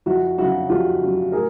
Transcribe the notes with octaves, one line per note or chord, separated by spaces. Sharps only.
F2 E4 F#4
C#3 F#3 E4 F#4
F2 F4 G4
C#3 F#3
A2 G#4 A#4